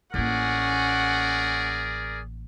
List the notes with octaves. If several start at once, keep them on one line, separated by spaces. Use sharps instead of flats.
A1 A#3 C#4 G#4 A#4 D5 F#5